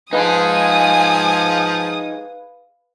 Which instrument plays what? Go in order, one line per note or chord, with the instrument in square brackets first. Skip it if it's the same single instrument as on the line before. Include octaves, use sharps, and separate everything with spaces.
[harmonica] F3 [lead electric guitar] D#4 G#4 [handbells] B4 F5 B5 [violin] G#5 D#6